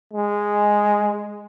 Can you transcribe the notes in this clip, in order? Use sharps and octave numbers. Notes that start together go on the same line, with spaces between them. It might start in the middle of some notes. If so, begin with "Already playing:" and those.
G#3